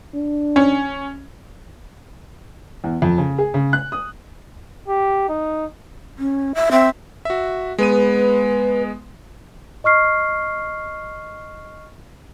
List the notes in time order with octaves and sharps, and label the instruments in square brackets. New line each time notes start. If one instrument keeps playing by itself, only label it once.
[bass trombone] D4
[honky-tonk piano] C#4
[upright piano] E2
F2
C#3
G#4
C#3
F#6
D#6
[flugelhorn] G4
D#4
[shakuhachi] C#4
E5
[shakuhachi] C4 [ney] E5
[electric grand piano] F#4 E5
[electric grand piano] G#3 B3 D#7 [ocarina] B4
[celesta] D#5 C#6 F6 C7